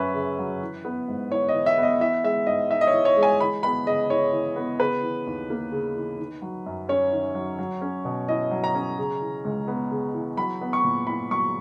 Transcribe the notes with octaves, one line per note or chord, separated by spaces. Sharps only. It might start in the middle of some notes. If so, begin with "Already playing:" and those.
Already playing: F#2 F#3 C#4 B4 E5
C#3
F#3
E3
B3
G#2
E4 C#5
D#5
E3
E5
B3 D#5
E3 E5
G#3 E5
G#2 D#5
D#4 E5
D#5
C#5
E3
C#5
G#3
G#5
E3 B5
B3 B5
C#3 D#5
E4 C#5
E3
B3
C#3 B4
E3
D#2
A#3
C#3
E3
D#3
F#3
F#2
C#4 C#5
D#3
F#3
F#3
C#4
B2
E4 D#5
F#3
A#5
C#4
C#3
E3
C#2
B3
C#3
E3
F#3 B5
B3
C#6
A#2
E4 B5
F#3 C#6